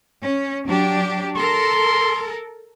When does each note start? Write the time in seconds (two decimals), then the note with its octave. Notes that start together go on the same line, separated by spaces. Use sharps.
0.23 C#4
0.66 F#3 D4 G4
1.36 A4 A#4 C6